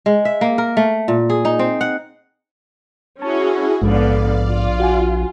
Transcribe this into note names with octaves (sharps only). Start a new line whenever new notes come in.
G#3
E5
A#3
A#4
A3
A#2
G#4
D#4
C4
F#5
C#4 E4 F#4 G#4 A5
A#1 G#2 D3 B3 D5 F5
F4
F#4 F#5 G#5